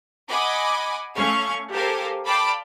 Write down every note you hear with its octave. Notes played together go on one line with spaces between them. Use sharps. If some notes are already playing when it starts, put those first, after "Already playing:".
D#5 F#5 G#5 B5 D6
A3 C#4 F5 C#6 F6
G4 A4 A#4 C5 F5 G#5
D5 F5 G5 A5 B5 D6